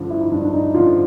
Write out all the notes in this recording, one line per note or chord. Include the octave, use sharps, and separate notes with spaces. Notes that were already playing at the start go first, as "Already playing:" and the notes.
Already playing: G2 D3 F3 C#4
E4
D#4
G2 D4
D4
D#4
D3 F3 F4